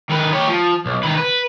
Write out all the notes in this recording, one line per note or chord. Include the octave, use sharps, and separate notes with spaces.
D#3 B4
G4 C#5
F3
B1
D#3 B4
B4